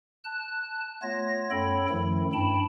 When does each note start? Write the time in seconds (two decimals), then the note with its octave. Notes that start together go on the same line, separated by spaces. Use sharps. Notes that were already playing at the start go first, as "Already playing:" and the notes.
0.24 A5 F#6
1.02 A3 B3 F4 C#5 A#6
1.51 F#2 A4 C#5 G5 B5
1.89 F#2 D#3 F3 A3 E4
2.33 G2 G5 A5 B5